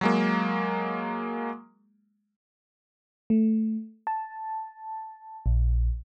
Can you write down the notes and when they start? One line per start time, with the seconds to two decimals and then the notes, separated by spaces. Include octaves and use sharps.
0.01 F#3 G#3 A#3
3.30 A3
4.07 A5
5.46 A#1